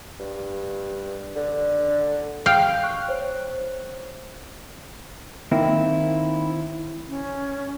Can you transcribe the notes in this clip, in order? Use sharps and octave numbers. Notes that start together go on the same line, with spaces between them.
G2
D3
F5 G5
C#6 F#6
C5 C#5
D#3 A#3 C4 E4
C#4